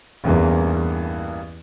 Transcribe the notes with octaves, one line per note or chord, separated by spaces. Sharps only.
A1 E2 G2 E3 A#3